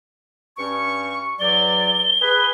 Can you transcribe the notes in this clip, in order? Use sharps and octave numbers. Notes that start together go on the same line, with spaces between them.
G2 C#4 C#6
E2 F#3 D5 G7
G#4 B4